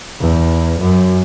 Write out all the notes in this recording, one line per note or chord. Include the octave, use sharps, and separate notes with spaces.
E2
F#2